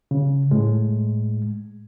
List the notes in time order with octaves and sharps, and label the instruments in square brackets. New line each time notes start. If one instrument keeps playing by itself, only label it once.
[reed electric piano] C#3
A2 G#3